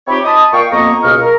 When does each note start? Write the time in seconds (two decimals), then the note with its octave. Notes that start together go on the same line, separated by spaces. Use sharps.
0.08 C4 D#4 F4 G4 C#5 B5
0.25 D#5 A5 B5 D#6
0.53 A#2 F5 G5 C#6
0.72 F2 A#3 B3 D#5 A#5 C#6
1.04 C#2 B2 D#5 F5 C#6 F6
1.21 A#4